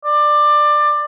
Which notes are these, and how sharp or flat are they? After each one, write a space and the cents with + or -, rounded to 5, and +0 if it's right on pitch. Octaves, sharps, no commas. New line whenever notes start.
D5 +20